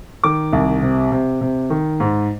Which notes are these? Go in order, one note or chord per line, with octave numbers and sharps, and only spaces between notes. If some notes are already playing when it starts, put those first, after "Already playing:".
D#3 D6
C2
C3
C3
C3
D#3
G#2